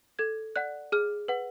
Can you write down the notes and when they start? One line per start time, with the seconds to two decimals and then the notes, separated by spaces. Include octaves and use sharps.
0.19 A4 G#6
0.56 D5 F#5 F#6
0.92 G#4 F6
1.28 B4 F#5